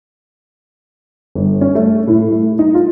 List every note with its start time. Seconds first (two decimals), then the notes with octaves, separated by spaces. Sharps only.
1.35 G1
1.61 C#4
1.75 A3
2.07 A2
2.31 A3
2.59 D#4
2.74 F4